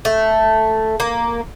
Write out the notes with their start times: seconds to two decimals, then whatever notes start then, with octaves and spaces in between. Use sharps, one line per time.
0.05 A3
1.00 A#3